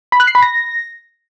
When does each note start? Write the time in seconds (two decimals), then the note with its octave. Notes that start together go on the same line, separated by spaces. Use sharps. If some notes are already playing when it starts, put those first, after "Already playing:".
0.12 B5
0.20 F#6
0.27 C7
0.35 B5
0.42 A#6